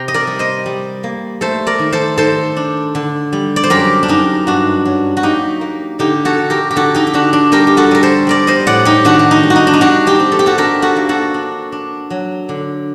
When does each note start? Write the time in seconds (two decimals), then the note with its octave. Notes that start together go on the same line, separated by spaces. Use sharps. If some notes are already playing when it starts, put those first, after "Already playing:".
Already playing: C3 G5 A#5 C6
0.08 D#5
0.14 A#4 D5
0.27 G3
0.39 C5 D#5
0.66 G3
1.04 A#3
1.41 A3 A4 C5
1.67 A#4 D5
1.79 D#3
1.92 A4 C5
2.17 D#3 A4 C5
2.56 D4
2.95 D3
3.33 G3
3.56 D5
3.64 C5
3.70 F#2 G4 A#4
4.03 D4
4.08 F#2 D#4
4.47 G2 D4 F#4
4.85 F#3
5.17 F#4
5.23 A#3 D#4 G4
5.61 A#3
5.99 D3 D#4 G4
6.25 F#4 A4
6.38 D3
6.50 G4 A#4
6.71 G4
6.76 D3 F#4 A4
6.94 D#4 G4
7.07 G4
7.13 D3 D4 F#4
7.33 D4
7.52 G3 G4 A#4
7.67 G4
7.77 F#4 A4
7.91 G3 A#4
8.03 A4 C5
8.27 G3 A#4 D5
8.47 C5 D#5
8.67 A2 D5 F#5
8.85 D#4 G4
9.05 D#3 D4 F#4
9.19 F#4
9.31 D#4
9.43 G3
9.50 F#4
9.56 D#4
9.67 D4
9.73 D#4
9.81 G3 D4 F#4
10.07 D#4 G4
10.20 C4
10.32 A4
10.39 G4
10.46 F#4 A4
10.58 D4 G4 A#4
10.82 F#4 A4
10.96 A#3
11.09 F#4 A4
11.34 D4
11.72 D4
12.10 F#3
12.49 D3